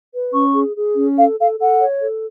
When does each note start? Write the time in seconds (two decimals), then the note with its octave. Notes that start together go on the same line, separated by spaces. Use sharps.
0.13 B4
0.33 C#4 C#6
0.55 G#4
0.75 G#4
0.96 C#4
1.17 A4 F5
1.39 A4 F5
1.59 A4 F#5
1.80 C#5
2.01 A4